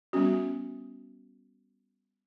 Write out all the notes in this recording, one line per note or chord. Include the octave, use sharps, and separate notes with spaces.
G3 B3 C#4 F#4